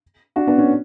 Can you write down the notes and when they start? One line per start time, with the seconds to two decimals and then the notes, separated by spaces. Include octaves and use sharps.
0.36 D4 F#4
0.47 B3 D4
0.58 C#4